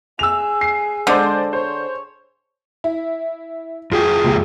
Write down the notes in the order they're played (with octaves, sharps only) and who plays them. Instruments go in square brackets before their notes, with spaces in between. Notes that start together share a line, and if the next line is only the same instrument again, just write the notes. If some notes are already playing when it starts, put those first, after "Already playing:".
[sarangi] G#4 [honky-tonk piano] E6 F7
[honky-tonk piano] C7
[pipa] D3 [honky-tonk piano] G#3 C5 D5
[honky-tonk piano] C5 [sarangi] C#5
[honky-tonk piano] E4
[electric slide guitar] F2 G#4 G5 [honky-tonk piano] F4 F#4
[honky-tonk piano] C#2 A#2 G4